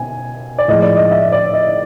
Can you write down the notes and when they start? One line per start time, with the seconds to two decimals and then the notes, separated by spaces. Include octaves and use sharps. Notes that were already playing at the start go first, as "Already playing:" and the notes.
Already playing: B2 G#5
0.59 D5
0.68 A2 F3 G#3 D#5
0.82 D5
0.96 D#5
1.11 E5
1.32 D5
1.54 D#5